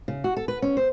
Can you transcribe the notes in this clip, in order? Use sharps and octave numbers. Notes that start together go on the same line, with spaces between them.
C#3
F#4
A4
B4
C#4
C5